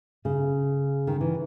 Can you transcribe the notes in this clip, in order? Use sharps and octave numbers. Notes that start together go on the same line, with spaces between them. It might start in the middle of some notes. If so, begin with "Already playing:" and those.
C#3
D#3
E3